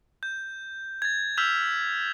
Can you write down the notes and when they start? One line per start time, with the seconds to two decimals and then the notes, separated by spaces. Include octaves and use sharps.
0.23 G6
1.02 G#6 A6
1.37 E6 F6 G6 B6 E7 F7